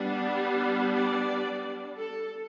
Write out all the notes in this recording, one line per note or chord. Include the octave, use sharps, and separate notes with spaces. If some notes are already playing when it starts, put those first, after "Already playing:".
Already playing: G3 B3 D4
D5
A4